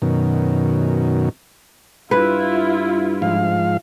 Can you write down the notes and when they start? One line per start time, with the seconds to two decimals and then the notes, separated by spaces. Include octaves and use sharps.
0.02 F#2 B2 D#3
2.11 G2 E4 F4 B4
3.22 G#2 F3 F5